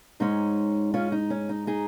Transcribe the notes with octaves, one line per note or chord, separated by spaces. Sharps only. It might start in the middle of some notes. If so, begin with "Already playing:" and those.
G#2 G#3 C#4 D#4
C#4 F4
D#4
C#4
D#4
D#4 G#4